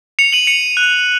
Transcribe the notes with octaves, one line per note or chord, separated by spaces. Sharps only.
C#7 F7
D#7 F#7
C#7 F7
F#6